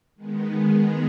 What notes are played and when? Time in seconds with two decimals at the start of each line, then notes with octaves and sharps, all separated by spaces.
0.15 D#3 G#3 B3
0.67 D#3 G#3 B3 G#4